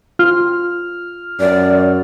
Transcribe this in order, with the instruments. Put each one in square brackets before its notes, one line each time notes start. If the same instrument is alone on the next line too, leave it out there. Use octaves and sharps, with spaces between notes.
[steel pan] F4 [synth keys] F6
[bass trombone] F#2 [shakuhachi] D5